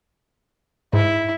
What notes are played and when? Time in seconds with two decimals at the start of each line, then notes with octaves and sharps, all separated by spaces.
0.93 G#2 E4